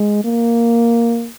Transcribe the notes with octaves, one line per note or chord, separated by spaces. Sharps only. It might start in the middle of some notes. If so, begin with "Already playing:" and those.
Already playing: G#3
A#3